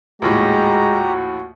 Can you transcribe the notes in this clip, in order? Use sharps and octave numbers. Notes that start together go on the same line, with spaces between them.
A#1 D#2 A2 G#3 F#4 G4 A#5